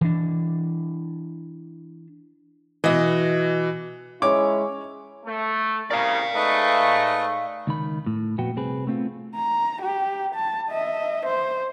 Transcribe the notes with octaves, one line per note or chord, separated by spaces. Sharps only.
E3 D4
B2 E3 F#4 D#5
G#3 C#4 E4 C#5 D6
A3
C2 C#3 A#4 D5 F5
G#2 A3 B4 D#5
C#2 D#3 B5
A2
F2 A#2 B3 F#4 G5
C2 C4 G#4 B4
A3 B3 C4 D4 F4
A#5
G4
A5
D#5 E5
C5